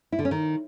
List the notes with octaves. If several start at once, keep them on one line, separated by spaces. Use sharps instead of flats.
E4
D3
C#4
D#3